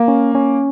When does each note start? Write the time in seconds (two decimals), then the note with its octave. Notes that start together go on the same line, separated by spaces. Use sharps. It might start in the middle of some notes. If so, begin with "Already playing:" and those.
Already playing: A#3
0.08 C#4
0.35 C#4